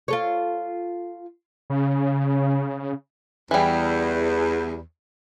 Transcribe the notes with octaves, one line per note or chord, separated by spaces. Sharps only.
F4 A4 C#5
C#3
E2 E3 G3